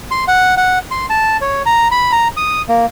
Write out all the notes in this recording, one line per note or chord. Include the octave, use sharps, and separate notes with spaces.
C6
F#5
F#5
C6
A5
C#5
A#5
B5
A#5
D#6
A#3